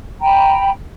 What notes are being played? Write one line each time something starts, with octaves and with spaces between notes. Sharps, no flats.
G5 A#5 B5